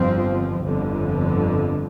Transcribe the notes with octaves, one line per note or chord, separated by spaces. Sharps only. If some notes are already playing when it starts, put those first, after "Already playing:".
Already playing: G1 F2 F3 C4
G1 F2 D3